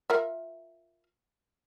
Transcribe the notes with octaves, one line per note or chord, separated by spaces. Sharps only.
F4 A#4 E5